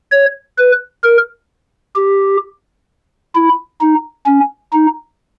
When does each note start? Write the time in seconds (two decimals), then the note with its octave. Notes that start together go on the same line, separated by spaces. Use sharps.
0.12 C#5
0.58 B4
1.04 A#4
1.95 G4
3.35 E4
3.80 D#4
4.26 C#4
4.72 D#4